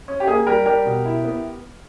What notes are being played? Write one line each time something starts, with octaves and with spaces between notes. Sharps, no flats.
C#4
G4
A#3 G#4
G3 G4 A#4
G3 G4 A#4
B2
E4
B3